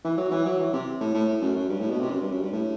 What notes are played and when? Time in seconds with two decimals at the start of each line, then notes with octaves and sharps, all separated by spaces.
0.04 E3
0.18 F#3
0.31 E3
0.45 F#3
0.60 E3
0.73 C3
1.01 A2
1.14 A2
1.28 A2
1.41 F#2
1.56 F#2
1.69 G2
1.80 A2
1.90 B2
2.00 C3
2.11 F#2
2.21 G2
2.31 F#2
2.42 G2
2.52 A2